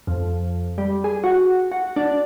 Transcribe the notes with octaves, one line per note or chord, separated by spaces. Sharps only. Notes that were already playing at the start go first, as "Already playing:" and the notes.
F2
G3
G#4
F#4
F#4
D4